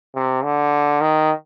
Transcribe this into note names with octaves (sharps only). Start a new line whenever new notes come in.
C3
D3
D#3